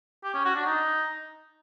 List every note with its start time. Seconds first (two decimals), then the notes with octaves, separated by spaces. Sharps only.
0.24 G4
0.34 C#4
0.45 F#4
0.55 D4
0.66 D#4